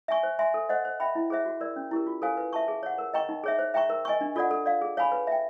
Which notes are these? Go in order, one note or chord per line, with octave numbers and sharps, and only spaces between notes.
E5 G#5 C#6
C5
E5 G#5 C6
A4
C5 D#5 F#5
C5
E5 G5 B5
E4
G#4 C5 E5
F#4
A#4 D5
C#4
E4 G4 A#4
F4
A4 C5 F5 G#5
B4
E5 A5 C#6
G#4
C#5 F#5
A#4
D#5 G5 A#5 C#6
D#4
G#4 C#5 E5
C5
E5 G5 A#5 C#6
A#4
D#5 G#5 C#6
D4
F4 A4 D5 F#5
A4
D5 F5
G#4
C#5 F5 G#5 B5
B4
E5 G5